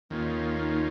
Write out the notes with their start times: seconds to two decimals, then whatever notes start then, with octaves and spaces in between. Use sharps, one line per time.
0.10 D#2 D#3 A#3 C#4 F4
0.59 D#4